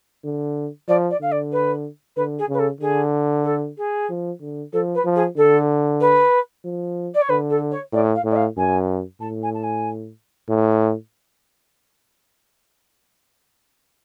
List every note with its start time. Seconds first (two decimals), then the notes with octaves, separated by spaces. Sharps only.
0.24 D3
0.88 F3 D5
1.10 D5
1.21 D3 F5
1.32 D5
1.52 B4
2.16 D3 B4
2.39 G#4
2.49 C#3 B4
2.59 A4
2.81 D3 G#4
3.44 A4
3.78 G#4
4.10 F3
4.41 D3
4.73 F3 A4
4.95 B4
5.05 F3
5.16 G#4
5.36 D3 A4
6.01 B4
6.65 F3
7.14 D5
7.22 C#5
7.29 D3 B4
7.50 A4
7.71 C#5
7.93 A2 D5
8.15 F5
8.25 A2
8.31 D5
8.36 F5
8.57 F#2 G#5
9.21 A2 A5
9.43 G#5
9.54 A5
9.63 G#5
10.49 A2